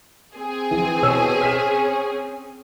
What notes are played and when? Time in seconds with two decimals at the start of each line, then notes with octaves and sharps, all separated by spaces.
0.35 C4 G#4
0.71 E3
1.02 B2 C#4 E6
1.41 F6 B6 E7